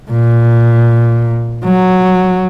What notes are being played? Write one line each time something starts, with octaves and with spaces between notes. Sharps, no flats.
A#2
F#3